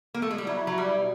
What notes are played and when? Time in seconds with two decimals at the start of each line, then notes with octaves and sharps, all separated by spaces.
0.14 A#3
0.22 A3
0.31 G#3
0.38 G3
0.46 F#3 E4
0.67 F#3
0.78 G3
0.93 B2